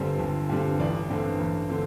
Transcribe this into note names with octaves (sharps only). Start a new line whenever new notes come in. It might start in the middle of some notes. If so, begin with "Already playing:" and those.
Already playing: G1 G2 D3 G3 C4 C5
G1
G2 D3 G3 C4
A1 D5
G2 D3 C4
A1
D3 C4